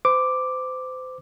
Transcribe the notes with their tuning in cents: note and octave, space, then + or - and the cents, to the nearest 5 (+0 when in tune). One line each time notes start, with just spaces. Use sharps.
C5 -35 D6 +0